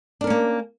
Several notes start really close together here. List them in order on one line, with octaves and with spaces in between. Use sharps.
D4 A#4 C#4 A#3